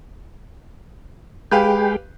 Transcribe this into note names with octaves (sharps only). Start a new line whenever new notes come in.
G#3 G4 G#4 B4 F5 G5